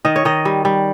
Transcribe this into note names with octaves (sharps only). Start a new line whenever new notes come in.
D#3 D#5
C#5
D#3 D#5
G3
G3